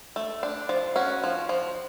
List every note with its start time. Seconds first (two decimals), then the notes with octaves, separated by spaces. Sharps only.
0.16 A3
0.43 D4
0.69 F3
0.96 C#4 F#4
1.24 F3
1.49 F3